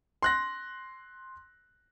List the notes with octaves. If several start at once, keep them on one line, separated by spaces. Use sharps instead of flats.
C6 F#6 A#6